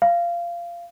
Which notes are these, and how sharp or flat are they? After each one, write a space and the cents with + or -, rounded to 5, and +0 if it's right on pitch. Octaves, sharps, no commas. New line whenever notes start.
F5 -20